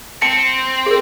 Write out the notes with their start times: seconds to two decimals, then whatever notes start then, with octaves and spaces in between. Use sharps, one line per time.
0.22 C4 A5 C#7
0.86 G#4 A#4